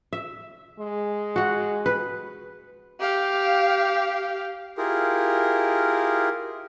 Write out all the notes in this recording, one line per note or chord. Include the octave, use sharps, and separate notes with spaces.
E5
G#3
F#4 F#5
B4
G4 F5
E4 F4 G4 G#4 A#4